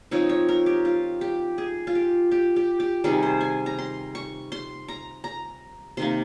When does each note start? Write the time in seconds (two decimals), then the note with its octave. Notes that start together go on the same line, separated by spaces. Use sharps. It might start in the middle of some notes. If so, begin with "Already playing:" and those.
0.11 F3 C4 D#4 C#5
0.29 C#5
0.49 A#4
0.66 G4
0.85 F4
1.21 G4
1.58 G#4
1.87 F4
1.95 G4
2.31 G4
2.56 G4
2.80 G4
3.04 C3 D#3 G3 G#4
3.23 C5
3.41 G#5
3.66 A#5
3.78 C6
4.15 C#6
4.52 C6
4.88 A#5
5.24 A#5
5.97 C3 D#3 A#3 C6